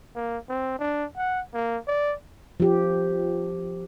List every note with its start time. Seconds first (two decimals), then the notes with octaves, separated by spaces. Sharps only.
0.15 A#3
0.49 C4
0.79 D4
1.17 F#5
1.54 A#3
1.88 D5
2.60 F3 G4